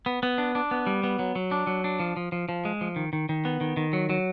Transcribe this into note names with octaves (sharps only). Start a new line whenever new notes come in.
B3
B3
D4
D4
B3
G3
B3
F#3
F#3
D4
F#3
D4
F3
F3
F3
F3
G#3
F3
D#3
D#3
D#3
B3
D#3
D#3
F#3
F#3